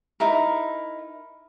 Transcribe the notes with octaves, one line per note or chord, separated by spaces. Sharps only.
D#4 E4 A#4